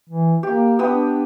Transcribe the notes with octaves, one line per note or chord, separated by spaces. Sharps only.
E3
A#3 G4
B3 D4 G4 D#6